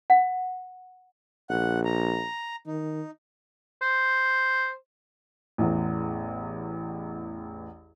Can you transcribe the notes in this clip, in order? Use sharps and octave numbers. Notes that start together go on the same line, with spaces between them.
F#5
A#1 F#5
A#5
D#3 D#4
C5
A1 E2